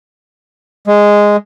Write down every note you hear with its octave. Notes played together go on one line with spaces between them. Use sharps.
G#3